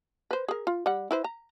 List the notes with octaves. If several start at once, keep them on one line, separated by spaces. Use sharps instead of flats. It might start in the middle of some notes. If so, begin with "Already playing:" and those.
B4 C5
G#4 A#4
F4
G3 F#5
E4 B4 C5
A#5